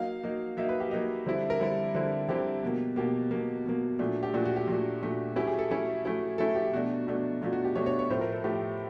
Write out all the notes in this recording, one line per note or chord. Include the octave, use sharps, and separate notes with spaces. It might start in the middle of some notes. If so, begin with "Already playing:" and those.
Already playing: F#3 A#3 D#4 F5
F#3 A#3 D#4
F#3 A#3 D#4 E5
B4
G4
F#3 A#3 D#4
D3 G3 C4 E4
A#4
D3 G3 C4 E4 A4
D3 G3 C4 E4
D3 G3 C4 E4 G4
B2 F#3 A#3
B2 F#3 A#3 G4
B2 F#3 A#3
B2 F#3 A#3
A#2 F#3 A3 D4
G4
A#2 F#3 A3 D4 F#4
F#4
G4
A#2 F#3 A3 D4
A#2 F#3 A3 D4
F#3 A3 C#4 E4 G4
G#4
A4
F#3 A3 C#4 E4 A4
F#3 A3 C#4 E4
F#3 A3 C#4 E4 A4
G4
B2 F#3 A3 D4 F#4
B2 F#3 A3 D4
B2 F#3 A3 D4 F4
F#4
G4
B2 F#3 A3 D4 C#5
C#5
C#5
A2 F3 A3 C5
A#4
A4
A2 F3 A3 G4